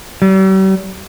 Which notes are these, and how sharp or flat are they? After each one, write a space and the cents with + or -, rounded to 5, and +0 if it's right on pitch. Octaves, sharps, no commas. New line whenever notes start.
G3 -45